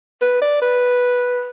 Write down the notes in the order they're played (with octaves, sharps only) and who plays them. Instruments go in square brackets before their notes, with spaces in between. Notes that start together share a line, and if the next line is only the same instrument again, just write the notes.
[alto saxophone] B4
D5
B4